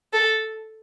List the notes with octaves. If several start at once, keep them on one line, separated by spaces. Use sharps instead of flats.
A4